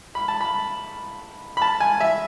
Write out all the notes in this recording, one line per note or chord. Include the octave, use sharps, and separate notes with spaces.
B5
A5
B5
B5
A5
G#5
E5